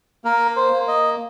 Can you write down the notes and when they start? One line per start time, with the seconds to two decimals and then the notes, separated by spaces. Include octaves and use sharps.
0.24 A#3 A#4
0.56 C5
0.73 A#3
0.88 D#5